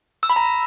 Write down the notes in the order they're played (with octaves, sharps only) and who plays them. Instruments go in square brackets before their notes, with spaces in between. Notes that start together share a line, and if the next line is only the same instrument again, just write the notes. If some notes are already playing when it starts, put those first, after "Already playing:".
[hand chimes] E6
B5
A#5